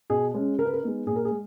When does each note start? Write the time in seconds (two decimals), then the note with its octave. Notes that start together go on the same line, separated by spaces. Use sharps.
0.10 B2 G#4
0.34 G#3 C#4
0.59 C#3 A#4
0.65 B4
0.73 A#4
0.83 G#3 B3 D#4
1.07 A#2 G#4
1.16 A#4
1.25 G#4
1.31 G#3